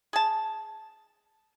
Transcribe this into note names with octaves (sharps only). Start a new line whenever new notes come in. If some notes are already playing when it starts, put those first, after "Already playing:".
G#4 A5